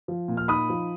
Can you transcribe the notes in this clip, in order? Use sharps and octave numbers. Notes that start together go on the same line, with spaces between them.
F3
A#2
F6
D#4 B5 D#6
F3